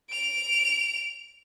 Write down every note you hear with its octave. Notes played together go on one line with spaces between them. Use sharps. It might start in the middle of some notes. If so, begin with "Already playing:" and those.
D7 F7